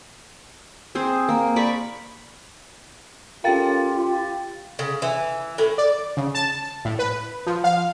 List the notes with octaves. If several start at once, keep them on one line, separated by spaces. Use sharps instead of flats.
C4 G#4 C5
A#3
D5 B5 C#6
C#4 F4 G4 A4 A#4 F5 G5 A6
C#3
E3
A2
D5
C#3
A5
A2
B4
F3
F5